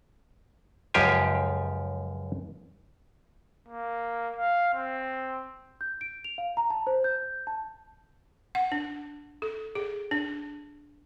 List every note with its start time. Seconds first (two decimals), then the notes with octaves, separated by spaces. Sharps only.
0.94 C#2 F#2 F3 G4 F5 G#5
3.68 A#3
4.36 F5
4.74 C4
5.81 G6
6.01 D7
6.24 F7
6.38 F5
6.57 A#5
6.70 A5
6.87 C5
7.04 G6
7.47 A5
8.55 F#5
8.72 D4
9.42 A4
9.75 G#4
10.11 D4